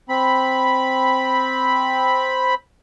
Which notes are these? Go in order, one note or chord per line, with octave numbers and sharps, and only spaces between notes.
C4 B5